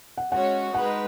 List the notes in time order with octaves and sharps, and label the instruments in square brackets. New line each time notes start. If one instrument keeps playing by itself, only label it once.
[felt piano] F#5
[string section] G#3 C#4 F#4 C#5 [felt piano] F#5
[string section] G#3 D#4 B4 [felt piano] F#5